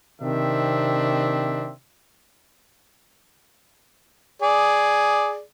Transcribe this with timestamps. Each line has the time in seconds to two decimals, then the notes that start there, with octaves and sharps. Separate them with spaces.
0.22 C3 D#3 C4 D4 E5
4.42 G#4 D5